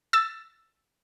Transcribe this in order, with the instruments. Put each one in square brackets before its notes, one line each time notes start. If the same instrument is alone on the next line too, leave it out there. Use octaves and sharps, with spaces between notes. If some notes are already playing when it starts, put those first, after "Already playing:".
[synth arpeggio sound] E6 A6